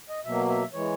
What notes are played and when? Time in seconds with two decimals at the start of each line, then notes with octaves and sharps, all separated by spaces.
0.09 D#5
0.25 B2 F#3 A#3 E5
0.49 E5
0.73 E3 G#3 C#5